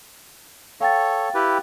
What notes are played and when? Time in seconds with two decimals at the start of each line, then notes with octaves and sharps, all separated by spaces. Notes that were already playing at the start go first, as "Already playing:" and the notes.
0.81 A4 C#5 F5 G5 A6
1.34 E4 G4 B4